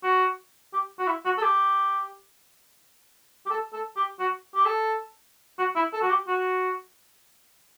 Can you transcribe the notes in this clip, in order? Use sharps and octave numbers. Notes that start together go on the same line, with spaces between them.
F#4
G4
F#4
E4
F#4
A4
G4
G4
A4
A4
G4
F#4
G4
A4
F#4
E4
A4
F#4
G4
F#4